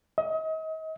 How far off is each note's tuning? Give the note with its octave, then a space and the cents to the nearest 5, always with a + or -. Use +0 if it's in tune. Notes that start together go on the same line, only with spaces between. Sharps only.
D#5 +35